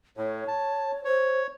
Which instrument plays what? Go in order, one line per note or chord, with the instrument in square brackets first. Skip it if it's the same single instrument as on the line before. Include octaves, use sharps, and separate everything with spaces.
[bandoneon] A2 [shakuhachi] C#5
[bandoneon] A5
[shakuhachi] C5 [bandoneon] C#5